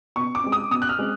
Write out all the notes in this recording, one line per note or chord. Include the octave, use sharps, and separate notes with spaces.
B2 C#6
D6
G#3 C4
D#6
B2 D#6
F#6
F6
G#3 C4